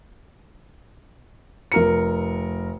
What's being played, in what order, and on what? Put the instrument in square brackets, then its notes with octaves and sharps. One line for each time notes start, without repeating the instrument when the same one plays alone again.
[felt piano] F1 A#4 C#7